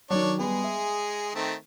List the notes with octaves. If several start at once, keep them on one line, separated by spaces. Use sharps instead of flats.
D#3 F#3 D4 C#5
G3 G#3 B3 G#4
E5
D#3 A3 C4